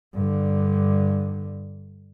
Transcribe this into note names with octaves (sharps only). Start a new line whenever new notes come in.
G2 D3